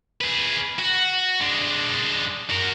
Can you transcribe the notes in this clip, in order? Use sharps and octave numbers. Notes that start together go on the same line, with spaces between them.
G#4 B4
F#4
G#3 D4
F#4 A#4